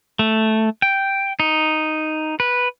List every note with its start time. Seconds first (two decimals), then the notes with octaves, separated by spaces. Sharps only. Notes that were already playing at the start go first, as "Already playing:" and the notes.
0.19 A3
0.82 G5
1.40 D#4
2.40 B4